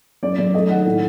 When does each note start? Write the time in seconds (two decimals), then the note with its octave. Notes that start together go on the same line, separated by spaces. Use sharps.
0.23 F#2 D5
0.38 F#2 D5
0.54 A3 D#5
0.69 D#3 F#5
0.85 A2